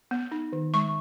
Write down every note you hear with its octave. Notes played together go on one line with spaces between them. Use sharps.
B3
D#4
D#3
G#3 C#6